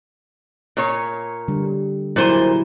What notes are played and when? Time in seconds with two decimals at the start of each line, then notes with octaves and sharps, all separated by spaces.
0.77 A#2 C#5
1.48 D3 G3
2.16 A#2 F#3 E4 G#4 C5 G#5